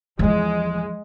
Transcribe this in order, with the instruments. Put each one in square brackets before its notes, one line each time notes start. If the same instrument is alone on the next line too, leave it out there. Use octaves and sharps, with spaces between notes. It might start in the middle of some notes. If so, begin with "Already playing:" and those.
[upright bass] E2 F3 [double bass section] G#3